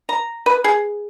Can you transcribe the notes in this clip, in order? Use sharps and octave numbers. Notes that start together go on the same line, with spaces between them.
A#5
B4
G#4